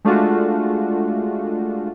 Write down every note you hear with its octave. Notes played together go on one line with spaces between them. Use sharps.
G#3 A3 D4 F4 F#4